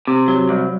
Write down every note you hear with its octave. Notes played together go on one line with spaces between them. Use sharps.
C3
F#3
C2